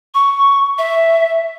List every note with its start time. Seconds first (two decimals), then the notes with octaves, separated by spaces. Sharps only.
0.14 C#6
0.78 E5